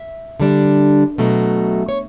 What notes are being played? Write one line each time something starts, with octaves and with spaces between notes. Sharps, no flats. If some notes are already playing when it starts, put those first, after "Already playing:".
Already playing: E5
D3 G3 D4
B2 F#3 A3
C#5